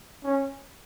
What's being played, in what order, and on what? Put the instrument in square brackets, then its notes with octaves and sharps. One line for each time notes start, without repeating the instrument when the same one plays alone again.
[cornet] C#4